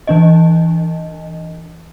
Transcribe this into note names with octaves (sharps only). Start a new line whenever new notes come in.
E3 D4 D#5